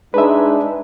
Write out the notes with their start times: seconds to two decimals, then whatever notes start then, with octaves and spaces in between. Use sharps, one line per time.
0.14 G#3 D4 D#4 B4 E5